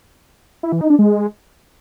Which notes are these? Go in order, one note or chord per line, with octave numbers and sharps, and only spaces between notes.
E4
E3
D#4
D4
G#3